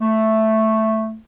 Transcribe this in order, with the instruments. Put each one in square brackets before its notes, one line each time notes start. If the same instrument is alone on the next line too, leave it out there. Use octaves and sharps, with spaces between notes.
[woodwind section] A3